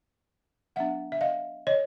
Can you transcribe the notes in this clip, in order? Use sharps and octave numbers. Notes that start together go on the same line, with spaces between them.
F#3 B3 D4 E5 F#5
E5
D#5 F5
C#5 D#5